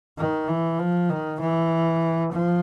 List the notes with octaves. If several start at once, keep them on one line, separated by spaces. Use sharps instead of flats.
D#3
E3
F3
D#3
E3
F3